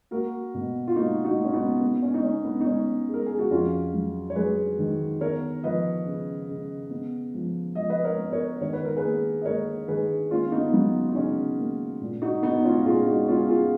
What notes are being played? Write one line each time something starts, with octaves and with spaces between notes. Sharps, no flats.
A#3 F#4 A#4
B2
F4
A#3 D#4 F#4
D#4 F#4
A#3
C#4
B3 D#4
B3
C#4
D#4
B3 C#4
B3
D#4
B3 C#4
G#3
A#4
G#4
F#4
F2 C#4 F4
F#3
C#5
F#3 G#4 B4
D#3
B3 A#4 C#5
F3 B4 D#5
C#3
C#3
B3
F3
F3 D#5
B4 D#5
A#4 C#5
B3
A#4 C#5
D#3 C#5
B4
A#4
G#4 B4
A#3
D#5
A#3 A#4 C#5
D#3 G#4 B4
A#3 C#4 F4
B3 D#4
F#3 B3 D#4
D#4
C#3 C#4
A#3
A#2
D#4 F#4
B3 D#4
C#4 F4
A#2 F4 G#4
D#4 F#4
B3 C#4 F4
F4 G#4